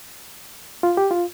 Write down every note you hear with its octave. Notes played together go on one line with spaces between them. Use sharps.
F4
G4
F4